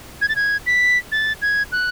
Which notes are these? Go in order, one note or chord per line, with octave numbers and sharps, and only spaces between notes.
G#6
A6
G#6
B6
A6
G#6
F#6